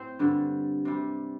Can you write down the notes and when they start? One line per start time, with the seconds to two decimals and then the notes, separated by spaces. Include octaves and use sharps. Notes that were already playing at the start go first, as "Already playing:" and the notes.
Already playing: A2 C4 C5
0.19 G2 D3 G3
0.85 C3 G3